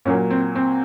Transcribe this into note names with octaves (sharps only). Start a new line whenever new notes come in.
A#2 F#3 A#3 C#4
C4
C4